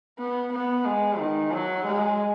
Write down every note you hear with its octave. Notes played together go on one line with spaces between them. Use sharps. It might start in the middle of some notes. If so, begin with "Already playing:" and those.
B3
B3
G#3
D#3
F#3
G#3